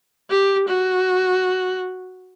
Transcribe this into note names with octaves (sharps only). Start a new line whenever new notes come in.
G4
F#4